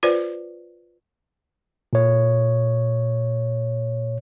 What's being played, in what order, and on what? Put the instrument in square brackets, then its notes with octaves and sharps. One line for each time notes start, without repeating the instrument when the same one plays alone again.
[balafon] F4 B4 C5 D5
[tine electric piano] A#2 C#5